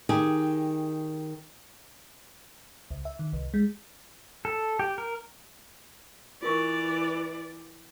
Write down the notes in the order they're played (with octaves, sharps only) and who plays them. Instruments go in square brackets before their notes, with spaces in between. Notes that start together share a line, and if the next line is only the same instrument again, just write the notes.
[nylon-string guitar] D#3 G4 G#4
[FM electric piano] C#2
E5
D#3
C2
G#3
[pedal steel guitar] A4
G4
A#4
[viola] E3 D5 [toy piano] F4 A#4 C#6